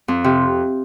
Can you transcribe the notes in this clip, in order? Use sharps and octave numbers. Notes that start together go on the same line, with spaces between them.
F2
C3